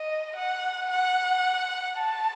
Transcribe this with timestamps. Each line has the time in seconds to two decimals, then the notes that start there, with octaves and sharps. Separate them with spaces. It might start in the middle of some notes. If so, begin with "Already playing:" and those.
Already playing: D#5
0.37 F#5
0.91 F#5
1.98 A5